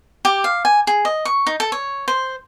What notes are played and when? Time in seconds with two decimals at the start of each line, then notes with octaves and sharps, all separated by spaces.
0.25 G4
0.44 F5
0.65 G#5
0.87 G#4
1.05 D#5
1.25 C#6
1.47 D#4
1.60 A4
1.72 C#5
2.08 C5